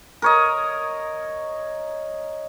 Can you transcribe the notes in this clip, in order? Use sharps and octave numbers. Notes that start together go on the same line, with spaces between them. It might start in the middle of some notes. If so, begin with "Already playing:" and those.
A#4 C#5 D#5